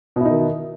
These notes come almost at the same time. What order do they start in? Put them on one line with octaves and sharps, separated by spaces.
B2 E4 D#4 D#3